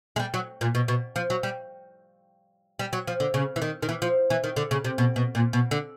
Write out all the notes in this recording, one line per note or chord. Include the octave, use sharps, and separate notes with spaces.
G#3
G3
F#3
A#2
B2
B2
F3
F#3
G3
G3
F#3
F3
D3
C#3
E3
D#3
D#3
E3
F3
E3
D#3
D3
C#3
C3
B2
B2
A#2
B2
D3